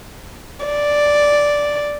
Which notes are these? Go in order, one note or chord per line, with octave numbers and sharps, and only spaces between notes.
D5